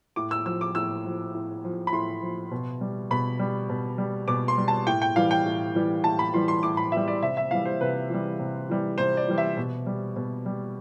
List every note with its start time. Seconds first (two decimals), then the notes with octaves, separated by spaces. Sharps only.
0.16 A2 D6
0.31 E6
0.46 F3 E6
0.61 D6
0.75 A2 E6
1.05 F3
1.34 A2
1.64 F3
1.87 B5
1.92 A2 C6
2.22 F3
2.51 B2
2.81 G3
3.11 B2 B5
3.39 G3
3.69 B2
3.98 G3
4.28 B2 D6
4.48 C6
4.58 G3
4.68 A5
4.87 A2 G5
5.02 G5
5.16 E3 G3 F5
5.31 G5
5.46 A2
5.75 E3 G3
6.04 A2 A5
6.19 B5
6.34 E3 G3 C6
6.48 C6
6.63 A2 D6
6.77 B5
6.92 E3 G3 E5
7.08 D5
7.23 C3 E5
7.37 E5
7.51 E3 G3 F5
7.65 C5
7.81 C3 B4
8.10 E3 G3
8.39 C3
8.69 E3 G3
8.98 C3 C5
9.17 D5
9.28 E3 G3
9.38 E5
9.57 B2
9.86 G3
10.16 B2
10.46 G3